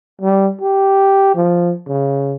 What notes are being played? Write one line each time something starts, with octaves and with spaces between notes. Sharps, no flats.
G3
G4
F3
C#3